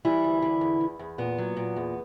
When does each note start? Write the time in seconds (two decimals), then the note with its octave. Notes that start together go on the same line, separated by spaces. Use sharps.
0.05 E3 G3 E4
0.24 D2
0.42 D3
0.61 E2
0.81 E2
0.99 E2
1.18 A#2 B3
1.38 F#3
1.57 A#2
1.76 E2